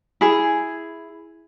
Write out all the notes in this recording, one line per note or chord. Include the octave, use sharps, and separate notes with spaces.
E4 G#4